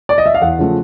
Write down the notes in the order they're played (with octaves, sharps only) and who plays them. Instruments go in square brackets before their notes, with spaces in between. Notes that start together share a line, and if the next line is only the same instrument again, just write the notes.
[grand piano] D5
D#5
E5
F5
E2 F#5
C#3 F3 A3